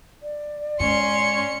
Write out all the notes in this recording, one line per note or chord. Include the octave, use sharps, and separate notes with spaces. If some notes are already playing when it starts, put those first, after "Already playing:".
D5
G#2 C#4 C6 C#7